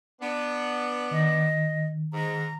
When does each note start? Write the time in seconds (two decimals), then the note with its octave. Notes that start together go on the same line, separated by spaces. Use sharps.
0.21 B3 D4
1.11 D#3 D#5
2.13 G#2 A#5